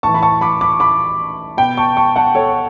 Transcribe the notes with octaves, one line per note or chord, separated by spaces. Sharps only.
A2 E3 A5 C#6
B5
A5 C#6
B5 D6
B5 D6
B5 D6
B2 G5 B5
A5 C#6
A5 C#6
F#5 A5
A4 C#5